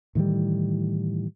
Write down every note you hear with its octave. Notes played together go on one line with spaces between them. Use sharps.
A2 D#3 E3 G3